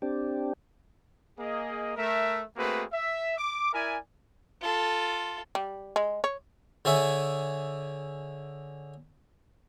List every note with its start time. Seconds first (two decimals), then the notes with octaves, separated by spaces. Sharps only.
0.02 C4 D4 G4
1.38 A#3 G#4 D#5
1.97 A3 A#4 E5
2.57 A3 A#3 C4 F#4 G#4 B4
2.93 E5
3.37 D6
3.73 E4 A#4 D5 E5 G#5
4.61 F4 A4
5.55 G3
5.96 G#3
6.24 C#5
6.85 D3 G#4 C#5 E5